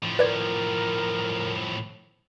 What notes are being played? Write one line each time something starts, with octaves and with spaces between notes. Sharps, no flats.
A2 F3
A#4 B4 D5 G#6